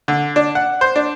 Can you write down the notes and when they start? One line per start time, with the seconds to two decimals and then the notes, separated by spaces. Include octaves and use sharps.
0.08 D3
0.36 D4
0.55 F#5
0.81 C5
0.96 D4